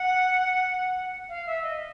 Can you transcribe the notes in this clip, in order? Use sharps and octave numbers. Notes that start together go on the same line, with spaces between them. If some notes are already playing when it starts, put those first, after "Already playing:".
Already playing: F#5
F5
E5
D#5